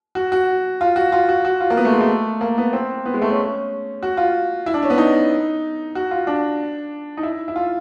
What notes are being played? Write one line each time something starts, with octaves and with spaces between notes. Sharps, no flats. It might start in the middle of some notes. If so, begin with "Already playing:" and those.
F#4
F#4
F4
F#4
F4
F#4
F#4
F4
A#3
B3
A3
G#3
A3
A#3
B3
C4
B3
G#3
A3
C#4
F#4
F4
E4
D4
C#4
B3
D#4
F#4
F4
D4
D#4
E4
E4
F4